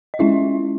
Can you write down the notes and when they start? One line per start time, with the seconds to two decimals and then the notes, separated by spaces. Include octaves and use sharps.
0.14 D#5
0.19 G#3 C#4 E4 F4 E5